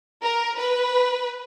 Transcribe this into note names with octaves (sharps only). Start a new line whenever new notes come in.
A#4
B4